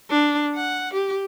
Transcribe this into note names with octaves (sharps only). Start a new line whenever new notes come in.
D4
F#5
G4